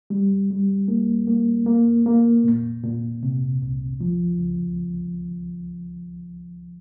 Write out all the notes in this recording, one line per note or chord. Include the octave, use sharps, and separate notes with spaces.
G3
G3
A#3
A#3
A#3
A#3
A#2
A#2
C3
C2
F3
C#2